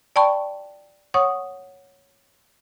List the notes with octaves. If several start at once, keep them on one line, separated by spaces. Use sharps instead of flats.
D5 G5 A5 B5 C#6
C#5 F#5 C#6 D#6